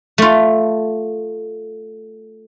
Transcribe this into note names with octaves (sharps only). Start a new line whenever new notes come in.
A3 F4